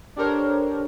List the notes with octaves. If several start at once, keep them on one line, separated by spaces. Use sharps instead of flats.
D4 G4 A4 A#4 C5 C#5